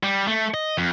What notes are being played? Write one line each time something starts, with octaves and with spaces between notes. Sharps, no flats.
G3
A3
D#5
F2